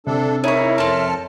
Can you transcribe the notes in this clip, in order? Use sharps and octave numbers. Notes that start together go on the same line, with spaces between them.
C3 D4 A4
C#4 D#4 E4 G#4 A#4 C#5 E5
F2 C4 A4 A5 F6